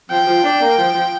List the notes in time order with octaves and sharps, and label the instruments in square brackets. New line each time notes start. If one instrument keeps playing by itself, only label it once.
[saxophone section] F3 [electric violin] G5
[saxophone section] F3
D4
A#3
F3
F3